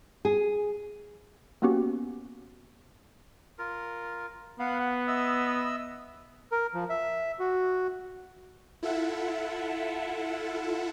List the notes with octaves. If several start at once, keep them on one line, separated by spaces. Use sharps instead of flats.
G#4
A#3 B3 C#4 F#4 G4
F4 A#4
B3 F5 F#5
F#5
D#5 E5 E6
A#4
F3
E5
F#4
E4 F4 A4 E5 F#5